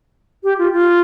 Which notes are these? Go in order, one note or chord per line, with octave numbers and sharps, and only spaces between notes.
G4
F4
F4